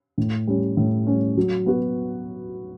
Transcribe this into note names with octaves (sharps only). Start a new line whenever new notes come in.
A2
G3 C#4
A2
G3 C#4
F#3
B3 F#4